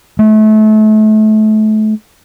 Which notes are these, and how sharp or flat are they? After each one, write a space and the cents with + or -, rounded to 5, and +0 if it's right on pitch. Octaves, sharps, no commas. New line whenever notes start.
A3 -30